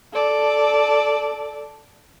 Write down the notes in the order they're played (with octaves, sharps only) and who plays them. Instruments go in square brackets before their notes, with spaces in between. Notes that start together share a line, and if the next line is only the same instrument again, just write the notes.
[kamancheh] A4 D5